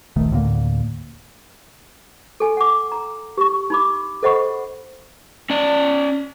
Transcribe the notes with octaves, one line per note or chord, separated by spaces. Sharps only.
D#1 A#1 D#3 A3
D2 A2 D3 A#3
A4 G#5
F#5 D6
A#5
G4 C#6
D#4 B5 D6
A4 C5 D#5 F#5 B5 C#6
C#4 D5